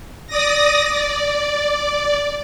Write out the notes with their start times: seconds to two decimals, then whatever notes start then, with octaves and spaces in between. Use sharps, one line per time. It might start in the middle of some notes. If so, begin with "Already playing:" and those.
0.27 D5 D#6 A#6
0.90 D5